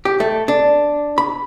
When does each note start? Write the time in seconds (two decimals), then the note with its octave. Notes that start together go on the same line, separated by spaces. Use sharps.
0.05 G4
0.20 A3
0.48 D4
1.18 B5